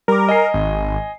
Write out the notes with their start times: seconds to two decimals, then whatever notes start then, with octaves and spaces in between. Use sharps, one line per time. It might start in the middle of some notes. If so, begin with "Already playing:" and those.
0.08 G3 A#4 D6
0.29 D#5 G#5 C7
0.54 G#1